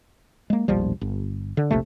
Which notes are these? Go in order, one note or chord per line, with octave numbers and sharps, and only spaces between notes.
G#3 A#3
E1 A#1 F3 G3
G1
D3
E1 A#1 C3 A3